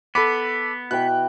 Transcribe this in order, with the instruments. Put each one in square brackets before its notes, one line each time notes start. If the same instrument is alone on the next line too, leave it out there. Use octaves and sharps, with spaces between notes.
[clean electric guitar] B3 [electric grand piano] A4 B5 D6
[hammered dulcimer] B2 E3 G5 [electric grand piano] F#6